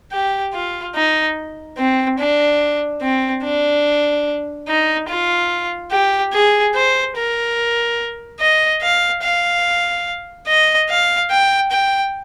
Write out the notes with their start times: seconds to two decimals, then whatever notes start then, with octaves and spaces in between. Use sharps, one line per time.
0.12 G4
0.54 F4
0.95 D#4
1.78 C4
2.19 D4
3.02 C4
3.44 D4
4.68 D#4
5.09 F4
5.92 G4
6.33 G#4
6.75 C5
7.16 A#4
8.40 D#5
8.82 F5
9.23 F5
10.48 D#5
10.89 F5
11.31 G5
11.71 G5